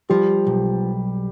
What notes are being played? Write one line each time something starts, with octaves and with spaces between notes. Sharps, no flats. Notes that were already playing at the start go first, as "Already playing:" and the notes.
F3 G3 G4
B1